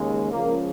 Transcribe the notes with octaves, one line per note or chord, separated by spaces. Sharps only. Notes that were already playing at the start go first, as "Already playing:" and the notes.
Already playing: D#2 C#3 G#3
C#2 C#3 F3 A#3